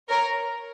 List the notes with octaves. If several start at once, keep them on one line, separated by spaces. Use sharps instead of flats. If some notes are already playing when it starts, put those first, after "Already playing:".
A#4 C#5